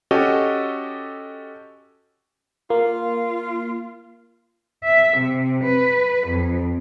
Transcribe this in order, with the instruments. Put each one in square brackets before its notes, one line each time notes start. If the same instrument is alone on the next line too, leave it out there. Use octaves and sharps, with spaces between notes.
[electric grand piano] C#4 F#4 G4 A4 D#5
[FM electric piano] A#3 [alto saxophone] F4
[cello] E5
C3
B4
F2